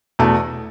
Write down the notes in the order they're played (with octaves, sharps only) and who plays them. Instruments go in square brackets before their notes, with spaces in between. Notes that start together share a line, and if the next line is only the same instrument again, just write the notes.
[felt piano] E2 B2 A3